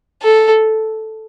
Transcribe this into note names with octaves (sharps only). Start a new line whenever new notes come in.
A4